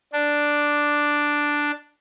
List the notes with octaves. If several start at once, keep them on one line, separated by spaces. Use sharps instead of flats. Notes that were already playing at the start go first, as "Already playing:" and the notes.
D4